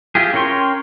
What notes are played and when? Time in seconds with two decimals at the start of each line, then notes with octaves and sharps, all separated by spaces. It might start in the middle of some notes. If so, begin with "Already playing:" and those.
0.15 E4 F4 G4 G#4
0.34 C#4 A#4 C#5 G5 C6